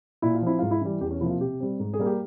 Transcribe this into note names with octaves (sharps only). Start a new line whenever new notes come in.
A#2 E4
F4
F3 C4 E4
G#2 F4
E4
E3 G3
E2 G4
C#4
C3 F3 A#3 E4
F4
C3 G4
G3 C4
G#2
G#4
G3 A#3
G4